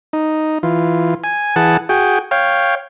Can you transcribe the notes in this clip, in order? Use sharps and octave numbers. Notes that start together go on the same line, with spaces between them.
D#4
E3 F4
G#5
E3 G#4 F#5 A5
F#4 G#4 G5
C#5 F5 G5